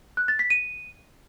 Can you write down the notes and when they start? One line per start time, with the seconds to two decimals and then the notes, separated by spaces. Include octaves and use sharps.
0.17 F#6
0.28 A6
0.39 B6
0.50 D#7